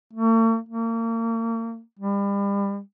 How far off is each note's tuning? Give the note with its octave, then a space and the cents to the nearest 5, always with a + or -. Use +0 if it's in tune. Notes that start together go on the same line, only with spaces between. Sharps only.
A3 +45
A#3 -35
G3 +35